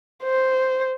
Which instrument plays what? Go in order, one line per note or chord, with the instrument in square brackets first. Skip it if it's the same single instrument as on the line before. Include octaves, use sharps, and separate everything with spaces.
[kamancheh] C5